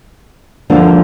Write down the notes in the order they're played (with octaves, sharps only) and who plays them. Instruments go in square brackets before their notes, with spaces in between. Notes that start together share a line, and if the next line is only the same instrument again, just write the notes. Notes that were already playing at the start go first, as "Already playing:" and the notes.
[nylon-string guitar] D2 D3 F3 A#3 D4